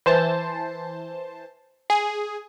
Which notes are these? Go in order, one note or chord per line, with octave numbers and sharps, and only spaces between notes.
E3 C5 A5
G#4